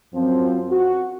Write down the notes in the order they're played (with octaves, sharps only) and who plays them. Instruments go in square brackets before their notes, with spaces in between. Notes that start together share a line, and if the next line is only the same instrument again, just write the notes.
[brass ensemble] F#2 F3 C4
F#4